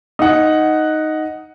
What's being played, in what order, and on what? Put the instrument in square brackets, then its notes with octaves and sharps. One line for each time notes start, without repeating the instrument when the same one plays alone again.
[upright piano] D#4 F#5